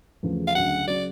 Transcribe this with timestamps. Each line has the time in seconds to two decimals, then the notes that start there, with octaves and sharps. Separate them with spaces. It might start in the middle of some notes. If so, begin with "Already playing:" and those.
0.23 E2 C#3 F3 A3
0.48 F5
0.55 D2 C#3 F#3 F#5
0.87 C#3 F#3 D5